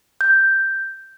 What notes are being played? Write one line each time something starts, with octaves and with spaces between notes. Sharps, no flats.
G6